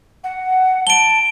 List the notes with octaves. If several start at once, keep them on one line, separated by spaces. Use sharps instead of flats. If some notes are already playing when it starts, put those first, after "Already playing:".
F#5
A5 D7 G7